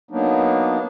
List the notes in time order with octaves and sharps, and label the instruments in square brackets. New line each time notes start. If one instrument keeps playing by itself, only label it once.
[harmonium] F#3 A#3 B3 D4 D#4